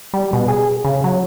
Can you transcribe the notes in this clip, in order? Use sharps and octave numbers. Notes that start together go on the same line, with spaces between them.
G3
B2
G#4
C#3
F#3